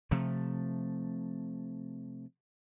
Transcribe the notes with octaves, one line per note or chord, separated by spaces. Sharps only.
C3 F3 A3